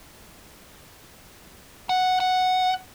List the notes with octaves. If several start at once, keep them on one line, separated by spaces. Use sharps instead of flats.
F#5
F#5